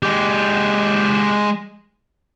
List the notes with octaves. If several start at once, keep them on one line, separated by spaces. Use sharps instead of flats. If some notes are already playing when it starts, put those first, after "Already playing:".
G#3 G4